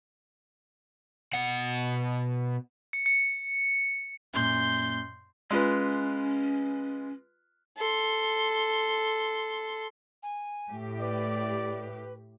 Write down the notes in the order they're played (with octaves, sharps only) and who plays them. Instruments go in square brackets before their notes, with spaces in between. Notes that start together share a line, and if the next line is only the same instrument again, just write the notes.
[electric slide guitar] B2 F#5
[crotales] C#7
C#7
[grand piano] F#2 A#2 [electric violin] C6 G6
[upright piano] G#3 F4 B4 [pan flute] C#4
[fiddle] A4 C6
[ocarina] G#5
[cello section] A2 G4
[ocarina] B4 [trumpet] D5